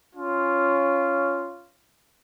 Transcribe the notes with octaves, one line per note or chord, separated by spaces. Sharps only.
C#4 F4